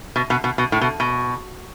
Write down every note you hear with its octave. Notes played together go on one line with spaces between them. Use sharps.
B2
B2
B2
B2
A2
B2
B2